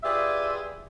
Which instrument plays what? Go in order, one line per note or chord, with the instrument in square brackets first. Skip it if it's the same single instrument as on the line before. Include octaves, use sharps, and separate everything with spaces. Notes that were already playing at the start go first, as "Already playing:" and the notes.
[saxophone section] F4 G4 G#4 B4 D5 E5